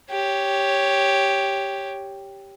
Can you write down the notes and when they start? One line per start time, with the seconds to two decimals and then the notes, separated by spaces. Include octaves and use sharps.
0.11 G4 C#5